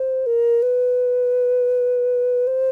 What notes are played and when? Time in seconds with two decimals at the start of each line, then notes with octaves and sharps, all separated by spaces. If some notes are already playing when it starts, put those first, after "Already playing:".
Already playing: C5
0.26 A#4
0.62 B4
2.47 C5